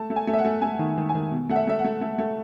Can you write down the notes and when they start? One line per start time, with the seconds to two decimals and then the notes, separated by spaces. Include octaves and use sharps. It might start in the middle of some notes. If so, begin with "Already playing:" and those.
Already playing: A3 A5
0.10 A3
0.16 G#5
0.27 A3
0.33 E5
0.39 F#5
0.45 A3
0.61 A3 G#5
0.79 D#3
0.98 D#3
1.09 G#5
1.15 D#3
1.31 B2
1.49 A3 F#5
1.56 E5
1.67 A3 E5
1.79 F#5
1.84 A3
2.01 A3
2.18 A3